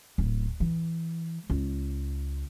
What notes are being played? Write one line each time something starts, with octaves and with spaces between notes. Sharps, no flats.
D1
E3
C#2